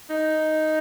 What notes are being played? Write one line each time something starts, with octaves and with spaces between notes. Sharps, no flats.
D#4